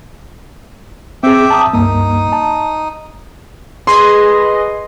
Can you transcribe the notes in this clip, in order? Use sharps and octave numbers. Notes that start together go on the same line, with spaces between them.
C4 G#4 E5 G5 D6
A5 A#5 D#6
C#2 G2 A#3 D#4 D#6
A5
G#4 B4 D#5 C6